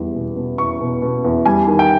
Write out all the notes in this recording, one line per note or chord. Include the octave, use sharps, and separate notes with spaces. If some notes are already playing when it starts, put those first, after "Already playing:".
Already playing: E2 G3
B2
B2
E2 C#6
B2
B2
E2
G3 G#5
D#3
G5